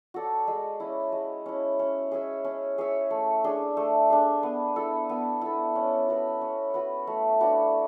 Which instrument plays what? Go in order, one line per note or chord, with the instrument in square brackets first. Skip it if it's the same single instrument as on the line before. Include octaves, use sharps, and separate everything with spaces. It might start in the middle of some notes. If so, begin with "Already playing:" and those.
[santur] F#4 A4 D5
G#3
C#4 E4
G#3
C#4 E4
C#4
G#4 C#5 E5
C#4
G#4 C#5 E5
A3
D4 G#4
A3
D4 G#4
B3
E4 A4
B3
E4 A4
C#4
F#4 B4
C#4
F#4 B4
A3
D4 F#4 B4